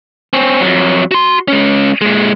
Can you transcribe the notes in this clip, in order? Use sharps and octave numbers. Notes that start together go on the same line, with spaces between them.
C4 C#4
F2 F#3
F#4 C6
G#3 C#4
A#2 G#3